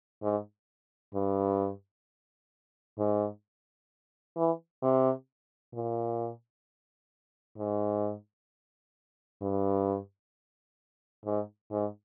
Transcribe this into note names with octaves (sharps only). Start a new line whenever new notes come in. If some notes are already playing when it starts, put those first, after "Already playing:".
G#2
G2
G#2
E3
C3
A#2
G#2
G2
G#2
G#2